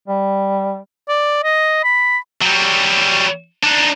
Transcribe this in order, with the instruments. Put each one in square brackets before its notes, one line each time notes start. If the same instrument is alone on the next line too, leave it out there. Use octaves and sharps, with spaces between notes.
[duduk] G3
[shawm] D5
D#5
B5
[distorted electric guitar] F#3 G3
D4 D#4